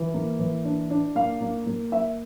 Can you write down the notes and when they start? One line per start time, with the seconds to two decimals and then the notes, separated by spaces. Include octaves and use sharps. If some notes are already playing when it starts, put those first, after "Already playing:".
Already playing: E3
0.14 A#3
0.39 E3
0.65 D4
0.90 D4
1.15 A#3 F5
1.41 A#3
1.66 A#3
1.92 A#3 E5